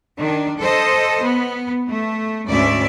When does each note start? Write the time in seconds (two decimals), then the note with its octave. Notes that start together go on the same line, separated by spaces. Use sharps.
0.18 D#3 D4
0.59 A4 C5 D#5
1.23 B3
1.88 A3
2.47 D2 G#2 C#4 D5 E5